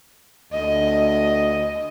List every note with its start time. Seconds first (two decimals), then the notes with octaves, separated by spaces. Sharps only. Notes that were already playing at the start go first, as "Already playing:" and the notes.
0.53 D2 D#5